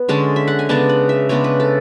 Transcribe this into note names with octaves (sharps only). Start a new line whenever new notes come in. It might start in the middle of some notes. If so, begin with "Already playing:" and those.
Already playing: B3
D3 G#3 C#4 A5
E5
F#5
G#5
C#3 G#3 B3 D4 A5
F#5
E5
C#3 G#3 B3 D4 C#5
B4
A4